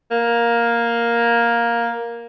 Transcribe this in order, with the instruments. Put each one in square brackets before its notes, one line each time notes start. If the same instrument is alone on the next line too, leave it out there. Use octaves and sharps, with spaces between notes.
[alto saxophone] A#3